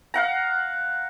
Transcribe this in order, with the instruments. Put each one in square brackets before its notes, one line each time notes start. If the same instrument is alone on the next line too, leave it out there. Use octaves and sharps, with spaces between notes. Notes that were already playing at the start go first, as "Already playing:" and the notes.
[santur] F5 F#5 A#5